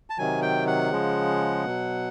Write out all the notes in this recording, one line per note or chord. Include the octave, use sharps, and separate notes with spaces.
A5
C3 D#3 F#3 G#5
G5
F#5
C#3 F3 G#3
B2 F#3